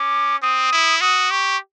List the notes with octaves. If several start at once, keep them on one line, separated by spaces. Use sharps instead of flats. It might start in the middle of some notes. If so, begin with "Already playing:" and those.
Already playing: C#4 D6
C4 D#6
E4
F#4 D#6
G4 C#6